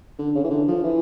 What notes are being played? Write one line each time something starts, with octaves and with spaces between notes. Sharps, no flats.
D3
C#3
E3
D3
F3
E3